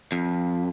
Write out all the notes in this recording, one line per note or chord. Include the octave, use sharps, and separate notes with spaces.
F2